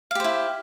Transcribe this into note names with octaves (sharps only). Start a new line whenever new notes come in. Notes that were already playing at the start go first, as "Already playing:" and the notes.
E4 G4 C5 F5